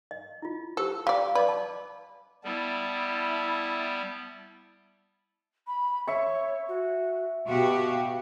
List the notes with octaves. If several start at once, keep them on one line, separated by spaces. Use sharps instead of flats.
D#5
E4 F4
G4 A4 C5
G3 D5 F5
B4 D5 D#5 D6
A5
G3 B3 E4 A5
B5
C#5 E5 C#6
F#4
B2 F#4 G4 F5